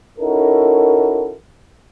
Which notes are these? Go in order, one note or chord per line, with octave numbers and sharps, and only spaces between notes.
C#4 D#4 E4 F#4 A4 A#4